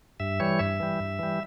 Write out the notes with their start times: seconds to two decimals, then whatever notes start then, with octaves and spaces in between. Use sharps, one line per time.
0.20 G2 E5
0.40 E3 G3 C#5
0.59 G2 E5
0.80 E3 G3
1.00 G2
1.19 E3 G3